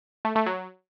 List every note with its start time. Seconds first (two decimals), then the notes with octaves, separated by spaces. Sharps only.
0.25 A3
0.35 A3
0.46 F#3